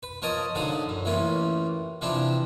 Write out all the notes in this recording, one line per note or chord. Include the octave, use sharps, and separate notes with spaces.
B4
F3 A#4 C#5 D#5 A5 D#6
G#2 D3 F3 F#3 F5 D#6
F#2
A1 E3 A#3 C#4 F4
C3 E3 F3 C4 D4 E4